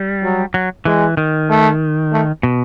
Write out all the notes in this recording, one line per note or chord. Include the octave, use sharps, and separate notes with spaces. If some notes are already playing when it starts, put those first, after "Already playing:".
Already playing: G3
F#3
F#3
E3 G#3
D#3
A3
A3
B2